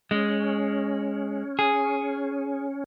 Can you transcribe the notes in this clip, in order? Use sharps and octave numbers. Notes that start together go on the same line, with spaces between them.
G#3 C#4
G#4